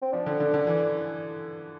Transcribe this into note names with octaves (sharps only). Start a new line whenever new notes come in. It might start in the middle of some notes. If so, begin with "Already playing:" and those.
C4
F3 D4
D3
D3
D3
E3